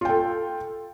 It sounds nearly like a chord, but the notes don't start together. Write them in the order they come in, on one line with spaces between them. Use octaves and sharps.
F4 G5 A4